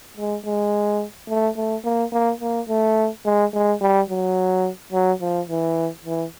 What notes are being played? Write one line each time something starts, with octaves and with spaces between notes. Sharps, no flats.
G#3
G#3
A3
A3
A#3
A#3
A#3
A3
G#3
G#3
G3
F#3
F#3
F3
E3
E3